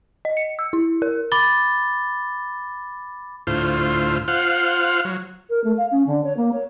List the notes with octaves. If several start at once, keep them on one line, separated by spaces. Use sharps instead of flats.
D#5
C#7
E6
E4
A#4
B5 D6 A6 G7
D2 A2 F4 C5
F4 C5 F5 F#5
F#3
A#4
A3
F5
C#4
D3
C#5
A#3
C#5